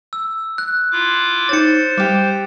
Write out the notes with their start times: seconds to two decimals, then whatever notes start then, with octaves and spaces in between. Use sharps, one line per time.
0.13 E6
0.58 F#6
0.92 E4 F4 D6
1.49 D#4 C5 C#5 A6 C#7
1.97 G3 G4 D6